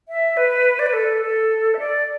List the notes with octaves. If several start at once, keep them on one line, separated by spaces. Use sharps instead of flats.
E5
B4
D5
B4
A4
A4
E5
D5